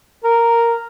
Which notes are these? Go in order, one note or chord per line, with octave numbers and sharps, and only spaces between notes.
A#4